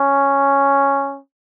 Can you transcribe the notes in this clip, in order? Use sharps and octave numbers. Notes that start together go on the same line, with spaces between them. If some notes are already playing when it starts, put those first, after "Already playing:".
Already playing: C#4